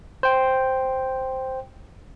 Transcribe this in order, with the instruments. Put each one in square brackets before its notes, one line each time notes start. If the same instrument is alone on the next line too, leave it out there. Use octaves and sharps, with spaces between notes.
[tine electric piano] C5 G5